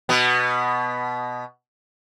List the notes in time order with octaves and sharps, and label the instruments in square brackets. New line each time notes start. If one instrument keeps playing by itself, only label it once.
[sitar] B2 B3